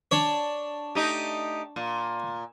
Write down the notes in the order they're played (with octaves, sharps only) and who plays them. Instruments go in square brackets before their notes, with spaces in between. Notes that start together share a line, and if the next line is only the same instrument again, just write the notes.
[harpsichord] D4 C#5
[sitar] A3 D#4 G4
A#2